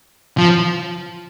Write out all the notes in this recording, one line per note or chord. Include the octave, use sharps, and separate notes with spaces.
F3